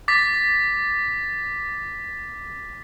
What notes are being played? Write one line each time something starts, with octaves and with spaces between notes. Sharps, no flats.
D6 A6 B6